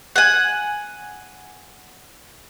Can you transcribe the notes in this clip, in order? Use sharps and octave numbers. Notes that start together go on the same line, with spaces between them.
F#5 G#5